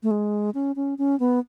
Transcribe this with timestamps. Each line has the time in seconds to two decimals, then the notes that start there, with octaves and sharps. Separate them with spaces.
0.03 A3
0.11 G#3
0.54 C#4
0.76 C#4
0.98 C#4
1.20 B3